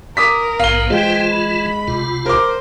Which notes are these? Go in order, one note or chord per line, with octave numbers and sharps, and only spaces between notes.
A#4 D6 D#6 B6
A#1 G#2 B3 F5 G7
E3 G#3 F4 C5 G5
B5
D2 C3 F4
A#4 C5 D6